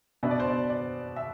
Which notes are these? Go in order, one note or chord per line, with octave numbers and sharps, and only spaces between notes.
B2 B3 D4 E5
D5
C5
D5
D5
E5